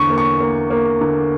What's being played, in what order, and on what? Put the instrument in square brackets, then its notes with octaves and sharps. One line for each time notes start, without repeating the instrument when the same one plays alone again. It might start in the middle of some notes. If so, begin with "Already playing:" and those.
Already playing: [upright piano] E2 D3 C#6
A#3
C#6
A#3
A#3
D3